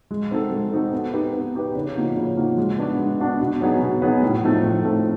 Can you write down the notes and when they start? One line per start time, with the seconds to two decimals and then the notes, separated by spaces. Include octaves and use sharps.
0.11 G#3
0.31 C4 D#4 F#4 A4
0.51 G#3
0.72 C4 D#4 F#4 A4
0.92 B3
1.13 D#4 G4 B4
1.34 B3
1.55 D#4 G4 B4
1.75 C#3
1.96 F3 A#3 D#4 F#4
2.16 C#3
2.37 F3 A#3 D#4 F#4
2.57 G#3
2.78 B3 D4 F#4
2.99 G#3
3.20 B3 D4 F#4
3.40 B2
3.61 F#3 B3 D#4 G#4
3.81 B2
4.02 F#3 B3 D#4 G#4
4.23 A2
4.44 F3 A3 C4 D#4
4.63 A2
4.85 F3 A3 C4 D#4